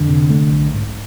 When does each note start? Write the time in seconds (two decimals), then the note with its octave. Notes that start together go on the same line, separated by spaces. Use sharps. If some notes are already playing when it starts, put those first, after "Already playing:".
Already playing: F2 D3
0.09 C3
0.30 A3
0.51 B1
0.74 G#2